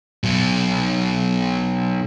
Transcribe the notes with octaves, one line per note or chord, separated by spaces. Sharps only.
B2 F#3